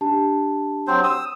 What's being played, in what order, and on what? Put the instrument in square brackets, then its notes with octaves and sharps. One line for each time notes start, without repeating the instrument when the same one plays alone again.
[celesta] D4 G4 A5
[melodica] F#3 C4 C5
D#6 E6